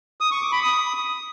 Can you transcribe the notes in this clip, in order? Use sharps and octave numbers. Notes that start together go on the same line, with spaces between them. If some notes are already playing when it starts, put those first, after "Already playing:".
D#6
C#6
D6
B5
D#6